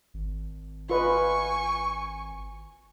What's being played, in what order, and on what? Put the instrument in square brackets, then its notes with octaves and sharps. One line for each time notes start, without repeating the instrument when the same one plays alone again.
[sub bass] G#1
[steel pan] F4 B4 D#5 [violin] G#5 C#6